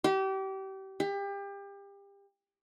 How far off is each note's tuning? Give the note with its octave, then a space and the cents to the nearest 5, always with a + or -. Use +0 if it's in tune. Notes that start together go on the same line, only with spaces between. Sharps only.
G4 -30
G4 +30